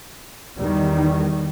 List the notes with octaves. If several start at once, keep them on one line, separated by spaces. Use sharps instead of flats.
E2 D#3 G3